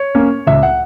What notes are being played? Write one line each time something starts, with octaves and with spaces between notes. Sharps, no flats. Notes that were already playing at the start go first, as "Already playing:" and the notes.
Already playing: C#5
A#3 C#4
C#2 E5
F#5